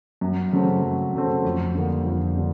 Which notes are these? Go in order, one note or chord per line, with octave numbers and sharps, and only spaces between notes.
F#2
C#3 F#3 A3 C4
F#2
C#3 F#3 A3 C4
F2
D3 G3 A#3
F2
D3 G3